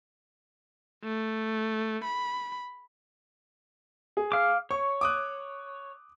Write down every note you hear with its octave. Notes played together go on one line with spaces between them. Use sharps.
A3
B5
G#4
F5 D6
C#5 C#6
D6 D#6 F#6